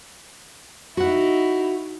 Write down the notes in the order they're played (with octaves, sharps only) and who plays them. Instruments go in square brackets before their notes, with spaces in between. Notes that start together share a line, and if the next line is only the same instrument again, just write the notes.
[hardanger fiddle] D#4 E4 [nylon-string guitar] F#4 F#5